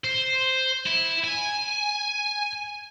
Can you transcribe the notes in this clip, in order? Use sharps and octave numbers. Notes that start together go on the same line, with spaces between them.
C5
E4
G#5